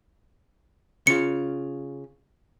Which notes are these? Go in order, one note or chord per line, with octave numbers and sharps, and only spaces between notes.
C#3 F4 C#7